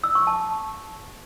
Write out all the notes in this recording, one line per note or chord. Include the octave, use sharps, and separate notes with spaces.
E6
C#6
A5